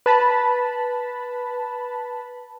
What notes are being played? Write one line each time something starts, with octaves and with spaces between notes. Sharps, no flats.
B4 A5 B5